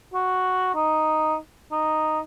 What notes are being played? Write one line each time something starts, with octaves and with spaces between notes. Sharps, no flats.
F#4
D#4
D#4